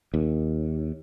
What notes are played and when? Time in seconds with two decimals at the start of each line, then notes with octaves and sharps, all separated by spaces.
0.14 D#2